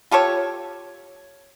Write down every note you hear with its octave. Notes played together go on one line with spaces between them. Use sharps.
F4 G4 A4 C#5